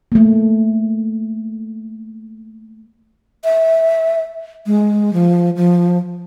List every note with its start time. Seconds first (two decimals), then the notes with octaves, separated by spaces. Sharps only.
0.12 A3 A#3
3.44 E5
4.66 G#3
5.13 F3
5.56 F3